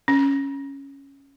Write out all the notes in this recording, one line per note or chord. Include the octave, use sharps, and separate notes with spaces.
C#4